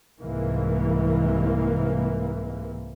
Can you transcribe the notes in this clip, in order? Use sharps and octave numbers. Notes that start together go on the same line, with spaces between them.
C2 G#2 C3 E3 A#3